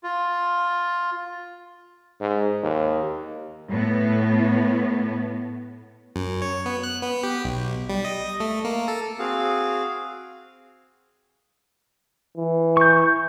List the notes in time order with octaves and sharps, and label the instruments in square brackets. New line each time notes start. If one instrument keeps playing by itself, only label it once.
[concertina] F4
[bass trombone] G#2
D#2
[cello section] A2 B3
[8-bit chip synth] F#2
C#5
B3
F#6
B3
G4
B1
G3
D#5
A3
A#3
A4
[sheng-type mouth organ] C4 F#4 G#4 F5
[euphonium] E3
[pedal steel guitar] C#6 G6